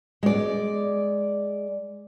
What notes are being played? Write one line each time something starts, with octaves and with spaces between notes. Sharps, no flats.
G#3 D5